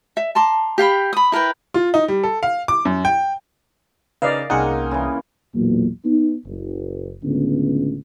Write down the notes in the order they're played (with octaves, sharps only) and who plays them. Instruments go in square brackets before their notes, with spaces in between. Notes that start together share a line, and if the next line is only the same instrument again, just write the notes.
[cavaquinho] E5
A5 A#5 C6 D6
G4 F5 G5 B5
B5 D#6
E4 A#4 B4 G5
[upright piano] F4
D#4
G3
A4
F5
D6
F#2
G5
[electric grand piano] C#3 D#4 [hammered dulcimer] A#4 [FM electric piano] B4 [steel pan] D5 D#5 F5
[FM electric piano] C2 G#4 D#6 [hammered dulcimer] A#3 C4 C#4 [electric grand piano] D#4 [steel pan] F#5
[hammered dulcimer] C#3 E3
[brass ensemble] B1 E2 A#2 F#3 A#3
B3 D#4
F#1
C#2 A2 D3 B3 C#4